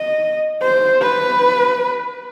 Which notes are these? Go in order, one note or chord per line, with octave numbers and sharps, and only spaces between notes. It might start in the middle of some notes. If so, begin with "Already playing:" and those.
Already playing: D#5
C5
B4